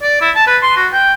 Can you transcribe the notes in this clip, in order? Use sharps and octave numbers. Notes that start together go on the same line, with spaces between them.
D5
E4
A5
B4
C6
F#4
G5